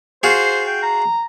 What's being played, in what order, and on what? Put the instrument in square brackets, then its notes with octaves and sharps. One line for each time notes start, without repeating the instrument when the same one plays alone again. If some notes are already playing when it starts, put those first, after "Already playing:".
[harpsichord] F4 F#4 G#4 [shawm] C5
[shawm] G5
A#5